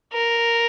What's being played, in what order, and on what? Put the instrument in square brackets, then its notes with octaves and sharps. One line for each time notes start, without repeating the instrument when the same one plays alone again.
[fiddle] A#4